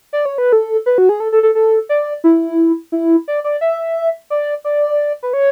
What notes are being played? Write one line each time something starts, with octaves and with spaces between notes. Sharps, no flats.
D5
C#5
B4
A4
B4
F#4
G#4
A4
A4
A4
A4
D5
E4
E4
D5
D5
E5
D5
D5
B4
C#5